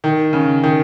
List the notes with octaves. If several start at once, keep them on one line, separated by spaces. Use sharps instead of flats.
D#3
C#3
D#3